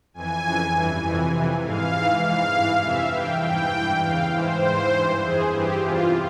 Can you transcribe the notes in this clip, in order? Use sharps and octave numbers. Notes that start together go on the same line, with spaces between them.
F2 E3 G#5
F2 C#3 E3
G2 E3
F2 C3 E3
F2 C3 E3
G#2 E3 F5
G#2 E3
G#2 E3 F5
G2 E3
F2 C3 E3 E5
G2 E3 G5
G#2 E3 G5
G2 E3
E2 C#3 E3 F5
G#2 E3 C5
G#2 E3
G2 E3
F2 E3 G#4
G2 E3 G4
E2 C3 E3 F4